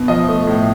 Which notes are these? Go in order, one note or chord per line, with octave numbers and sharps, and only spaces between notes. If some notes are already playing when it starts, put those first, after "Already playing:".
Already playing: B2
F3 D#5
A3
A2